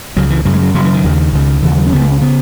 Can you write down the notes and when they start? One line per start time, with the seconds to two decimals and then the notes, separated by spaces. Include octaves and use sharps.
0.16 C#2 C#3 F#3
0.30 E3
0.45 F#2 C#3 F#3
0.54 G#3
0.63 F#3
0.75 F#2 C#3 F#3
0.85 E3
0.94 D#3
1.04 D#2 C#3
1.33 C#2 C#3
1.63 D#2 C#3 E3
1.77 F#3
1.86 C#4
1.92 C#2 C#3 B3
2.01 A3
2.12 C#4
2.21 C#3 B3